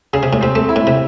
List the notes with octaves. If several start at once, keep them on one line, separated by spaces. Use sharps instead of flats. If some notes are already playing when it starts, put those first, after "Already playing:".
C#3 G#4
C3
A2
C3 C4
A3
E4
A2
C3